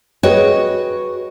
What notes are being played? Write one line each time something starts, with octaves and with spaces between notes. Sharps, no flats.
F#4 G#4 B4 C#5 D#5 G5